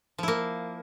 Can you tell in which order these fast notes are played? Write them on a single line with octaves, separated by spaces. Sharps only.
F3 E4 A#3